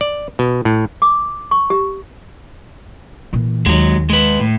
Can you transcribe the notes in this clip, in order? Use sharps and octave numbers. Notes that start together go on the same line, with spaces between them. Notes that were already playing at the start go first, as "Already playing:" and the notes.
D5
B2
A2
D6
C#6
G4
A#2 E3
D#2 F#3 G#3
G#3 B4
A2